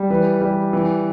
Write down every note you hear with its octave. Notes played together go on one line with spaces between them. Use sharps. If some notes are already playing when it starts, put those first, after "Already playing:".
Already playing: G3
E3 B4
G3
E3